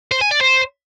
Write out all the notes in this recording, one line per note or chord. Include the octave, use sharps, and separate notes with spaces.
C5
G#5
D5
C5